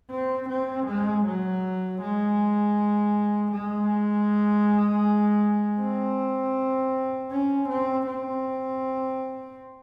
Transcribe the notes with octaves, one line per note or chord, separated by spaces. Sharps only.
C4
C4
G#3
F#3
G#3
G#3
C4
C#4
C4
C4